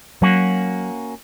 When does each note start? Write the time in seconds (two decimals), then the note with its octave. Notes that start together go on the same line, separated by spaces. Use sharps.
0.22 F#3 A#3 C#4 F#4